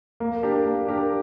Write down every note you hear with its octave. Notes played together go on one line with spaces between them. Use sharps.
A#3
D4 G4 A#4
A#3
D4 G4 A#4